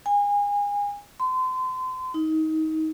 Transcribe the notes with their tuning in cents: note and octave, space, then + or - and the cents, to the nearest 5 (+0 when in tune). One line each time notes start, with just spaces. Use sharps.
G#5 -30
C6 -35
D#4 +25